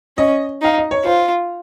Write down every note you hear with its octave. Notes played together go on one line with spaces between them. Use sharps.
C#4 D#5
D#4 F5
D#5
C#5
F4 C5